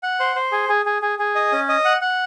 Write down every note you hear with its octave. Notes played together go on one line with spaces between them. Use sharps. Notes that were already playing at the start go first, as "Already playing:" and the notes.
F#5
C5
C5
G#4
G#4
G#4
G#4
G#4
D#5
C#4
D#5
F#5
F#5